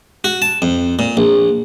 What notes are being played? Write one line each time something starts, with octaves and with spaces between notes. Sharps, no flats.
F#4
A5
F2
A#2
A#1